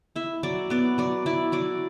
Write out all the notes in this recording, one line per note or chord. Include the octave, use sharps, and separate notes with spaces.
E4 E5
F#3 D5
B3 D5
F#3 D5
E4 D5
F#3 D5